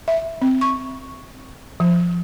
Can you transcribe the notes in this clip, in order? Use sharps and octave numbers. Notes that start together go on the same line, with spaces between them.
E5
C4
C#6
F3